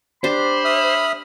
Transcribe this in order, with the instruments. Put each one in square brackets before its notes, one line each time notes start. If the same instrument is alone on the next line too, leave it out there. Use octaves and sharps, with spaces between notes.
[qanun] D4 G4 [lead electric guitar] C5 [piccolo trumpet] B5
[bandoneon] E5 D#6 F6